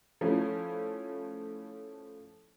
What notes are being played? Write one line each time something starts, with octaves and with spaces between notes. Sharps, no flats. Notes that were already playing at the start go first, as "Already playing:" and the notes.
F3 A3 C#4 E4